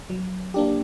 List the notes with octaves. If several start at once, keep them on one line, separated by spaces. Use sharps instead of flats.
F#3
A#3 D4 G4